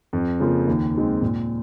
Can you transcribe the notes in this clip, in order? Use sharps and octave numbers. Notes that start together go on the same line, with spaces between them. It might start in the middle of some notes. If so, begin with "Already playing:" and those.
F2
C#3 F3 A#3
D#2
D#3 G#3 C4
A#2